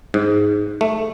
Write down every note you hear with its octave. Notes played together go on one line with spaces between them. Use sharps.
G#2
A3